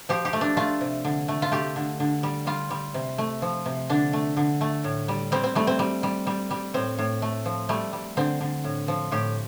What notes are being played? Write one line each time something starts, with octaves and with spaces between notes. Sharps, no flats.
F3 G4
G4
A3
D4
A3 F4
C3
D3
A3
F4
A3 G4
D3
D3
G3
G3 F4
G3
C3
A3
F3
C3
D3 D4
A3
D3
A3
A2
G3
G3 C4
C4
G3 A3
C4
G3
G3
G3
G3
A2 C4
A2
A3
F3
G3 A3
G3
D3 C4
D3
A2
F3
A2 G4